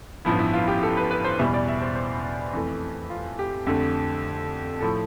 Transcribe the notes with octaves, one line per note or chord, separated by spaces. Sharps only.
A1 G2 F3 B3 E4
E4
F4
G4
A4
B4
B4
C5
E2 B2 G3 B3 E5
D5
E5
C5
C5
F2 E3 A3
F4
G4
F2 D3 A3
A2 F3 A3 A4